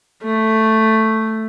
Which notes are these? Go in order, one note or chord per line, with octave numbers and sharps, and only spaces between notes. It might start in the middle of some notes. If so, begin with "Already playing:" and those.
A3